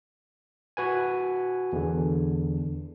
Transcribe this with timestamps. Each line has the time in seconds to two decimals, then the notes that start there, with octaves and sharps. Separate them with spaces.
0.77 F#4 B4 G#5
1.73 E2 D3